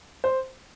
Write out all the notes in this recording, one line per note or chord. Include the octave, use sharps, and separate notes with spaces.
C5